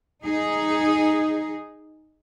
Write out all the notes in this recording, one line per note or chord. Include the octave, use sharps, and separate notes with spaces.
D#4 G#4